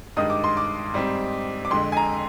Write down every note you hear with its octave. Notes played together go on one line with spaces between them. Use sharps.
G2 D#3 G#3 D#4 D#6
D6
C6
D6
G#2 G3 C4 D#4
D6
F2 D3 G#3 C6
G#5
A#5